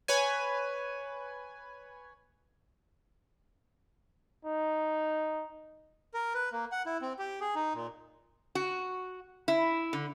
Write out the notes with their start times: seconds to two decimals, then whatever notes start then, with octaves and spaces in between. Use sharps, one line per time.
0.08 B4 C#5 G#5
4.45 D#4
6.14 A#4
6.34 B4
6.53 A#3
6.72 F#5
6.86 E4
7.01 C4
7.19 G4
7.41 G#4
7.55 D#4
7.74 A#2
8.55 F#4
9.48 E4
9.93 D3